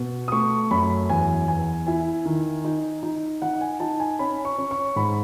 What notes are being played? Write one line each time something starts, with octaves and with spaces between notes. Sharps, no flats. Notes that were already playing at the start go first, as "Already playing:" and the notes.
Already playing: B2
D#6
A3 C#6
F#2 B5
E2 G#5
E2 G#5
E4 G#5
D#3
D#4
D#4
D#4 F#5
G#5
D#4 A5
G#5
C#4 B5
C#6
C#4
C#6
G#2 B5